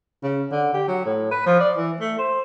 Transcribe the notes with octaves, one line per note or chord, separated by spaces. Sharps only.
C#3
D3
G4
F#3
A2
B4
F3
D5
E3
A3
C5